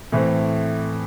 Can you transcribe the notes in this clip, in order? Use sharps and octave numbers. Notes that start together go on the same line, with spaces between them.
A2 E3 A3 C4